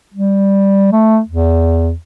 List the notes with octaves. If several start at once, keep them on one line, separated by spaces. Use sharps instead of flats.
G3
A3
E2